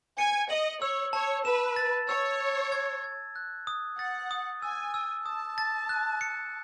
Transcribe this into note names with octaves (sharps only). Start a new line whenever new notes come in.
G#5 C#7
D#5 F#7
C#5 E6
C#5 A5
B4 E7
A6
C#5 E6
G#6
G#6
G#6
F#6
D#6
F#5 A6
D#6
G#5 E6
E6
A5 D#6
A6
F#6
C#7